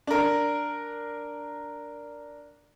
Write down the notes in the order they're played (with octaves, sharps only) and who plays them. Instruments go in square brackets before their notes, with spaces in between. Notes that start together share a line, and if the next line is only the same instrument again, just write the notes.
[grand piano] D4 A#4